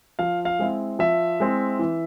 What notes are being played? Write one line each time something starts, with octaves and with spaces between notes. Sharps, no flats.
F3 F5
F5
G#3 C4 E4
F3 E5
G#3 C4 E4
E3